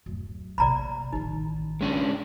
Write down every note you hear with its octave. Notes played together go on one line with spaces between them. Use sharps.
D1 F#2
A#1 C3 D5 A#5 B5
A1 D#3 D#4
G#3 C#4 D4